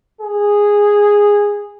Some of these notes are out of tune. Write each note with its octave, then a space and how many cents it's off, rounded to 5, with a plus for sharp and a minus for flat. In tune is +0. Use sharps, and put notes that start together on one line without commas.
G#4 -10